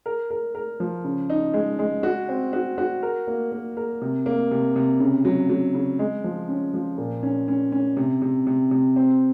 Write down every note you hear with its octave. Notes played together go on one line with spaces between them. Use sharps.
A#4
A#4
A#4
F3
C#3
D#4
G#3
G#3
F#4
C4
F#4
F#4
A#4
A#3
A#3
A#4
C3
A#3
C3
C3
C#3
F#3
F#3
C#3
G#3
F3
C#4
F3
A#2
C#4
C#4
C#4
C3
C3
C3
C3
C4